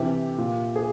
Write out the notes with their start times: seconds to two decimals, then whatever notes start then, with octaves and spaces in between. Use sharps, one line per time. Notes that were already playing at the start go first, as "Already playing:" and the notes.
Already playing: C3 E3 G4
0.38 A#2
0.76 G#4